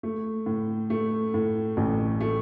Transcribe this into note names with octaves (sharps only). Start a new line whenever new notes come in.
A3
A2
A3
A2
A1
A3